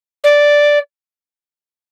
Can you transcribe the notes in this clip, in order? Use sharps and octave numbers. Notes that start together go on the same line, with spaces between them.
D5